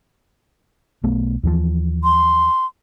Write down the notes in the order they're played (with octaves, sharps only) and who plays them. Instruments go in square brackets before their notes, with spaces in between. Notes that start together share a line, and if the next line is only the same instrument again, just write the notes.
[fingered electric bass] B1 A3 B3
D#2 E3 F3
[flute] C6